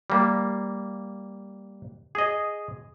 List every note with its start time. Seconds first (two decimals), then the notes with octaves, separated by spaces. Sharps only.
0.10 G3 A#3
2.15 G#4 D#5